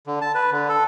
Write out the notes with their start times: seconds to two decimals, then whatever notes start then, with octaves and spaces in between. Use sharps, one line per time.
0.07 D3
0.21 A5
0.35 B4
0.52 D3
0.69 A4